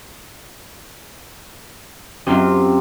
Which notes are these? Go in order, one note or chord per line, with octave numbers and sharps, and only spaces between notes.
F#2 C3 C4 F4